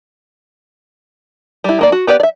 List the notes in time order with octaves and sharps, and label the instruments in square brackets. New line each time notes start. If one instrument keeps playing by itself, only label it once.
[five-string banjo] G3 E4
D#3 A#3 D5
F#4
B3 G4 B4 D5
D5 E5